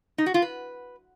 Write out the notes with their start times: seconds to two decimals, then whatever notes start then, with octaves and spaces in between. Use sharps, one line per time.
0.18 D#4
0.26 F#4
0.34 F4
0.42 B4